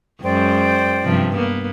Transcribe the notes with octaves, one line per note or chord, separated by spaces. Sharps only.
F#2 G#3 C5 D5 G5
G2 C3 F3
A#3 B3